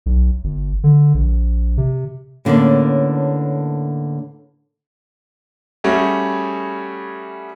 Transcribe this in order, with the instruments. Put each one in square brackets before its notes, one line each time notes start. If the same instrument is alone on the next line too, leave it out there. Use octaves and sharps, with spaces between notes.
[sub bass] B1
G1
D3
A#1
C3
[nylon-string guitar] A2 D3 A#3 B3 C#4
[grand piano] G3 A3 C#4 F#4 G#4